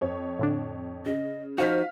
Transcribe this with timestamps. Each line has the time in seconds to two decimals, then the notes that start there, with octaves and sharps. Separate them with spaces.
0.01 F2 C#5
0.39 A2 D3 D4
1.06 C#3 D#5
1.58 F3 D#4 F#4 C5 F5 F6 B6